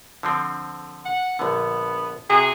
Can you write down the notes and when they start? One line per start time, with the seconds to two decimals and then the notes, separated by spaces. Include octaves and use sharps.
0.23 D3 F3 C4
1.05 F#5
1.39 A#1 D3 B3
2.30 C3 F#4 G#4